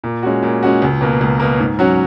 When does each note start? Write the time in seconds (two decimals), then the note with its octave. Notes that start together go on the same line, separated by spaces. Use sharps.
0.04 A#2
0.23 G#3 C#4 F#4
0.43 A#2
0.63 G#3 C#4 F#4
0.82 C#2
1.01 B2 A#3
1.21 C#2
1.40 B2 A#3
1.60 G#2
1.79 F#3 C#4 F#4